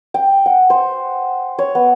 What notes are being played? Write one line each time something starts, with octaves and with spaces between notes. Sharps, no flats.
G5
F#5
C5
C#5
B3